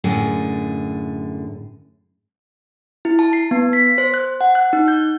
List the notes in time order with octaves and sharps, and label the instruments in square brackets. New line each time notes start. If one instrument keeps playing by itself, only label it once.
[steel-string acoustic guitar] F#2 A2 D3 G#4
[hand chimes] E4
A5
C7
B3
B6
C5
F#6
F#5
F#6
D#4
G6